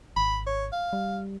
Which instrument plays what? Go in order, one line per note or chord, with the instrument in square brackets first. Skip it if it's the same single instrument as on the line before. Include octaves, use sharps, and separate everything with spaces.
[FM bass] G#1 [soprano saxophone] B5
[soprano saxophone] C#5
F5
[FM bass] G3